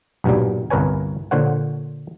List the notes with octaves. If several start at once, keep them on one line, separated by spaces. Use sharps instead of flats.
B1 G2 A#2 F#3 G3
G1 C2 A#4 B4 C#5 G#5
A#2 D3 C5 C#5 F#5